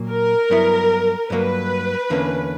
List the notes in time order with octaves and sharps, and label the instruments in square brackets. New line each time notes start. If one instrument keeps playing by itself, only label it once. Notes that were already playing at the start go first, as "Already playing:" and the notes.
Already playing: [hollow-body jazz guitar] A#2 F#3 A#3
[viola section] A#4
[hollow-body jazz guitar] G2 F#3 B3 E4
[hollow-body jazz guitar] G2 F#3 A#3 [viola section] B4
[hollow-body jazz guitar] E2 D3 A#3 C#4